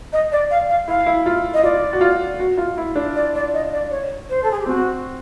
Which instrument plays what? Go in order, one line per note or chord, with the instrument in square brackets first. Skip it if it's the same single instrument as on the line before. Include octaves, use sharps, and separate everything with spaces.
[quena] D#5
D5
F5
F5
[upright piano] E4 [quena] F5
[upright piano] E4
F4
[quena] D#5
[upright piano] F4 [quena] D5
[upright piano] F#4
F4
F#4
F4
E4
D4
[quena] D5
D5
D#5
D5
C#5
C5
A4
G#4
G4
[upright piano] C4 [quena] F#4